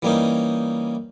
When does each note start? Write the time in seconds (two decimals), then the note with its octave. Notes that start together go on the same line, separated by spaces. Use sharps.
0.02 E3 G3 A#3 C#4 D#4